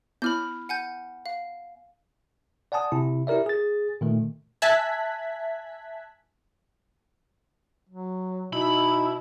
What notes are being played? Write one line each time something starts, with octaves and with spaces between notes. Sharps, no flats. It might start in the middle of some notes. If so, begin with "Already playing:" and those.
B3 E4 B5 F6 G6
F#5 G#5 G6
F5
D5 F#5 G#5 A5 D#6
C3 E4
E4 G4 A#4 D5 E5
G#4 A6
A#2 D#3 A3
E5 G#5 A5 F#6 G#6 B6
F#3
B2 D#4 E4 B5